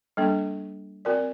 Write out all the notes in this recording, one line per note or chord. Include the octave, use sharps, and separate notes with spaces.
G3 A#3 D4 A4
C4 F#4 A#4 D5